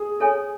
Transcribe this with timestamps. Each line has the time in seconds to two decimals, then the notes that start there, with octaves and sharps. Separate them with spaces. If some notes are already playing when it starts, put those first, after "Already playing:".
Already playing: G#4
0.20 A4 C#5 G#5